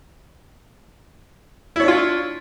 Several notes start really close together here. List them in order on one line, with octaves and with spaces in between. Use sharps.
E4 C#5 D4 F4